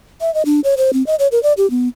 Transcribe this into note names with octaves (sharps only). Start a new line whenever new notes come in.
E5
D#5
D4
C#5
C5
C4
D#5
C#5
A#4
D5
G4
B3